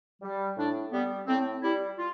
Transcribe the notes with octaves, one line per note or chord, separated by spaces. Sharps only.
G3
A2 D4
G3 B3
A2 C4
G3 E4
F4